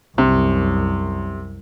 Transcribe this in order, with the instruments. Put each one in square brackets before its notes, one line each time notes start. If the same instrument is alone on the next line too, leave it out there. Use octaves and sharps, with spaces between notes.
[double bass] C2 F#2 [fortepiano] C3